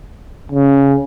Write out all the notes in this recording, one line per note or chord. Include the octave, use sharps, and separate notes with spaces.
C#3